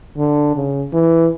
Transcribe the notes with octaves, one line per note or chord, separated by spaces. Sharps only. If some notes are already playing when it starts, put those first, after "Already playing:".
D3
C#3
E3